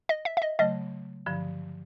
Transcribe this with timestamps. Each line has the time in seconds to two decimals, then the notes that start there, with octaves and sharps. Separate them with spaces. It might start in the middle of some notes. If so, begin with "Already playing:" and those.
0.09 D#5
0.25 E5
0.37 E5
0.42 D#5
0.59 C#3 F#3 A3 D#5
1.26 G2 D3 F3